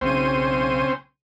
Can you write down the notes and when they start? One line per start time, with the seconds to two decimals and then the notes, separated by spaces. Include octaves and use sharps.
0.01 B1 C#3 C4 C#4 C5 D#7